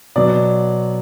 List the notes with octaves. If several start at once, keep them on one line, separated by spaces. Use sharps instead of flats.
B2 F#3 D5